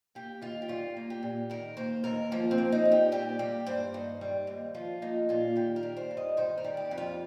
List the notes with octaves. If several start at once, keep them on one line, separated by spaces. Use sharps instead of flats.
A#3 G4
D#2 F4
G4
G3 F4
A#3
G4
A#2
D#3 A#4
A#3 C5
D#2 A#4
F3 A#3
C4
A#3
D#4
A#2
G4
G3 G4
A#3 G4
G2 C5
D#3
G3
D#2
F3 F4
A#3 D#4
A#2 F4
D#3 G4
A#4
G3
C5
G2
D#5
D#3 C5
A#4
G3
G4
F2
F4